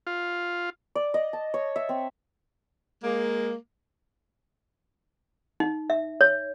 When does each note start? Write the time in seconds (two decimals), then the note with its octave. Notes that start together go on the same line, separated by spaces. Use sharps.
0.07 F4
0.95 D5
1.14 D#5
1.33 A5
1.54 C#5
1.76 E5
1.89 C4
3.04 G#3 A#3
5.60 D#4
5.90 E5
6.21 C#5